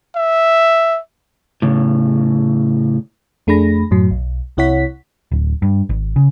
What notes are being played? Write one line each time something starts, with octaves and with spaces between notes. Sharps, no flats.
E5
A2 C#3
F2 A3 D4 G#4 B5 A#6
F#2 A2 F#3
B1
C2 C3 E4 C#5 F#5 B6
D1
G2
G#1
C#3